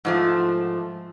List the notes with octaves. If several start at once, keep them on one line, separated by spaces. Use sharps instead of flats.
G#2 F3 A3